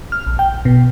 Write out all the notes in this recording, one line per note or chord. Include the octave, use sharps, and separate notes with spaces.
F6
A#1
G5
B2